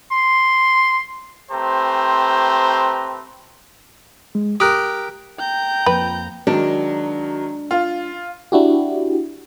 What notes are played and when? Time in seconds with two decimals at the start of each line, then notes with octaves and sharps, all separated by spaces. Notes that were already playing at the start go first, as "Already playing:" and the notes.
0.11 C6
1.52 A3 C4 G4 B4 C5 A#5
4.35 G#3
4.60 G4 A#4 D#6 F#6
5.39 G5 A#5 G6
5.86 F2 F3 A#3 B4
6.47 D#3 F#3 G#3 D4
7.71 F4
8.52 D4 E4 F#4 G4